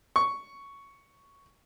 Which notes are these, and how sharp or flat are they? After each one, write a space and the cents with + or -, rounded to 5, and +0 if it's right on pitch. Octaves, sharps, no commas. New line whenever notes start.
C#6 +5